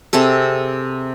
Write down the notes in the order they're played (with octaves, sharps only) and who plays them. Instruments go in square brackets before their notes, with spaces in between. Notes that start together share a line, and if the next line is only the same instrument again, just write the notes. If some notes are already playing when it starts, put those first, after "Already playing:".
[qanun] C3 C4 G#4 A4